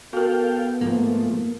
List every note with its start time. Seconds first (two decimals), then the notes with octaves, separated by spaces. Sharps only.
0.13 B3 F#4 A4 A#4 F5 G5
0.81 G#2 F3 A3 A#3